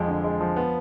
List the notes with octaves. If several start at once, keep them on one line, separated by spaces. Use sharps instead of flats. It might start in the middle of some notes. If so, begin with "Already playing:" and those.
Already playing: F2 F3 G#3
D3
G#3
F3
B3